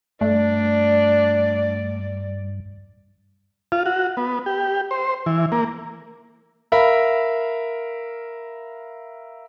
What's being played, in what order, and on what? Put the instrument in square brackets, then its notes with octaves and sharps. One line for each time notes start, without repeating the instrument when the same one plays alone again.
[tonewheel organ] G2 [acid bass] A3 [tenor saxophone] D4 [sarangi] D5
[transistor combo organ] F4
F#4
B3
G4
C5
E3
A#3
[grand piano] A#4 E5 F5 B5